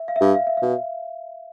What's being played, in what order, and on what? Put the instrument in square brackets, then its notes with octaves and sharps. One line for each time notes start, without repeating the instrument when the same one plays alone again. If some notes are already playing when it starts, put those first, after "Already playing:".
Already playing: [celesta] E5
F5
E5
[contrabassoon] G2 [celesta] F5
[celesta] F5
E5
[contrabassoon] B2 [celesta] F5